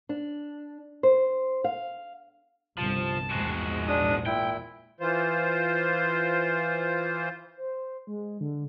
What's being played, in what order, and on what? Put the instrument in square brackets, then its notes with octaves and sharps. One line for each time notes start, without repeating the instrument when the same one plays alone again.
[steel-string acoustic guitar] D4
C5
F5
[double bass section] G1 C2 [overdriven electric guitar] F3 [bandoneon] A5
[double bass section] A#1 E2 G#2 [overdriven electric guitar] G#3 F#4
[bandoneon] D4 D#6
[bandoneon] A#2 E4 [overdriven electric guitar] G5
[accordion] E3 F4 C5
[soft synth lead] C5
G#3
D3